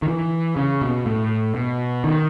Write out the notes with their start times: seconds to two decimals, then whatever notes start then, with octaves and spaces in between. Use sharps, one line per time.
0.02 D#3
0.08 E3
0.56 C#3
0.82 B2
1.06 A2
1.55 B2
2.04 D#3